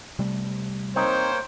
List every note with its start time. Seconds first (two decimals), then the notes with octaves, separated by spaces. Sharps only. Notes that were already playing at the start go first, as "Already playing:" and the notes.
0.19 C3 G3 A3
0.96 A#3 C4 D#4 C5 C#5 G5